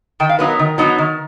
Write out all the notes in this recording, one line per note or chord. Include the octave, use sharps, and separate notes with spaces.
D#3 G5
F5
F#3 B3 D#4 B4
A#4
D#3
F#3 B3 D#4
D#3